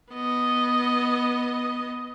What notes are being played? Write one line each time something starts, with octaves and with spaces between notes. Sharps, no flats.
B3 D#5